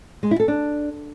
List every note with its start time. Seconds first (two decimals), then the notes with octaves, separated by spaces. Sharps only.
0.23 G#3
0.31 E4
0.40 A4
0.48 D4